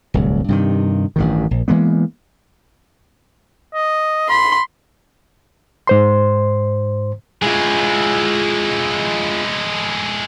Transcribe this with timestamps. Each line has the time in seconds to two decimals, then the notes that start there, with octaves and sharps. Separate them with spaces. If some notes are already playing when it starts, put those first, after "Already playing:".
0.14 D1 C2
0.48 G2 C3 D#3
1.16 A1 G2 D#3
1.51 A#1
1.68 E3 G#3 A#3 B3
3.74 D#5
4.29 B5 C6
5.87 G#2 C5 C6
7.42 G#3 E4 F4 G#4